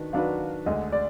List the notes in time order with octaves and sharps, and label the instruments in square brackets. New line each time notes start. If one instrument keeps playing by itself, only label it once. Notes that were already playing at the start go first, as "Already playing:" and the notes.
Already playing: [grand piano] D#3 D4 F#4 B4
[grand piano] D#3 F#3 D4 F#4 B4 [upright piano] F5
[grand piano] D2 D3 G#3 [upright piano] D#5
[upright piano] D5